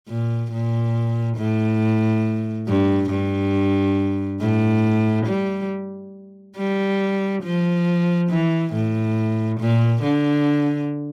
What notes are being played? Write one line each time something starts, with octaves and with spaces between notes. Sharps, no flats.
A#2
A#2
A2
G2
G2
A2
G3
G3
F3
E3
A2
A#2
D3